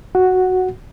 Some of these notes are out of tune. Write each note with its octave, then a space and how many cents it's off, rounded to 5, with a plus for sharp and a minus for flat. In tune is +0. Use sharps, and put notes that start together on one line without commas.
F#4 +0 F#5 +0